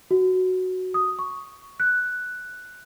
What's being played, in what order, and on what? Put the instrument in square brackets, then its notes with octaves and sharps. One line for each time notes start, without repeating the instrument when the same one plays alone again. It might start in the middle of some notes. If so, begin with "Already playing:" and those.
[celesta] F#4
D#6
C#6
F#6